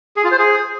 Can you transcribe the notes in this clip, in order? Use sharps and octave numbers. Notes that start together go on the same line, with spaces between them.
G#4
F4
C5
G#4